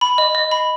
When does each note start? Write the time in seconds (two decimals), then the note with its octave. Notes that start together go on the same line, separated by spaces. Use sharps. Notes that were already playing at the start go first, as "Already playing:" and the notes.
0.01 B5
0.18 D#5
0.35 D#5
0.51 B5